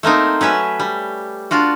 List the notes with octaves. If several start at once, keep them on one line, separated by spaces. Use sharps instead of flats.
A3 A#3 C4 D#4
F#3 C#4 B4 E5
G3
D4 F4 F#4